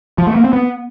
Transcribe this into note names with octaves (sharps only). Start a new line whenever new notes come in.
F3
A3
A#3
C4
B3